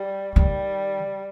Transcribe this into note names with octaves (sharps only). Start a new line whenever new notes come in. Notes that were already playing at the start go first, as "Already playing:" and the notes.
Already playing: G3
D#3 G3